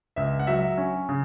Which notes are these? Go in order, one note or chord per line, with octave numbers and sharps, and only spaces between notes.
C#2 E5
F#5
F#3 E5
C#4
C#3